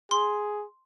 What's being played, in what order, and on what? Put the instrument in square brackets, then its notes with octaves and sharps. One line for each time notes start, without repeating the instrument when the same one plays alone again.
[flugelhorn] G#4 [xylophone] C6